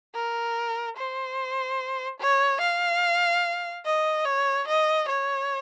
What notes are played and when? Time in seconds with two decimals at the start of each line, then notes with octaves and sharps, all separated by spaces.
0.15 A#4
0.97 C5
2.20 C#5
2.61 F5
3.85 D#5
4.25 C#5
4.68 D#5
5.08 C#5